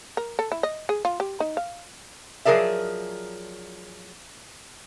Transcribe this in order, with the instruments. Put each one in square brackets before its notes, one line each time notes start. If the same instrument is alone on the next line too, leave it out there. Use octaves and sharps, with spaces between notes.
[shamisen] A#4
A4
E4
D#5
G#4
F4
G4
D#4
F5
[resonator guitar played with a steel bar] F3 F#3 G#4 A#4 D5 E5